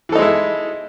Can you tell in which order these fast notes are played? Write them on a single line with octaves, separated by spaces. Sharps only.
E3 A4 D#4 G#3 E4